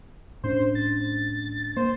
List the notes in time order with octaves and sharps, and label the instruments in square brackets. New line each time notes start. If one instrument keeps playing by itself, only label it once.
[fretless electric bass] A2 C#4 D4 [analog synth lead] C5
[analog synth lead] A6
[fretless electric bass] A#3 [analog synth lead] C5